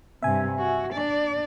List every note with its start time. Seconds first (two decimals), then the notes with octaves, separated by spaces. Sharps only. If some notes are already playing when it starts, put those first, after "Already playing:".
0.23 G2 C3 E5 G#5
0.59 F#4
0.92 D4 D5